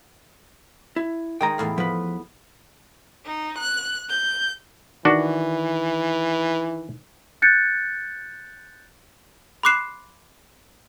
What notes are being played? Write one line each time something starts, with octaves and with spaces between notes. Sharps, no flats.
E4
D#3 G#3 G5 A#5
E2 A2 F5
F3 B3 B4
D#4
F#6
G6
D#3 E3 D4 F#4
F#6 G6 A6 C#7
B5 C6 D6 F#6 C7 E7